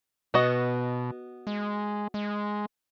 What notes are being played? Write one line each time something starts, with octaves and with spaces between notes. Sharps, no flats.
B2 B3 F#4 D#5
G#3
G#3